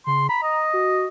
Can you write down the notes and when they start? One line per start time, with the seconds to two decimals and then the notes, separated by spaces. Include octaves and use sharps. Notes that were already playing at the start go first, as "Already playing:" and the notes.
0.07 C#3 C6
0.29 A#5 B5
0.43 D#5
0.73 F#4